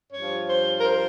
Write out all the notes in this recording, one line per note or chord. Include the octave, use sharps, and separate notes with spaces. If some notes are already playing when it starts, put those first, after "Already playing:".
G2 F3 C#5
C5
A#4
C5